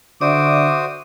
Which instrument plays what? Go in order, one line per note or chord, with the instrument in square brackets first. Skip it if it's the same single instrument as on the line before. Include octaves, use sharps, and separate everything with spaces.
[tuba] D3 [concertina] F#4 C5 D#6 [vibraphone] D5 E5 [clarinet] D6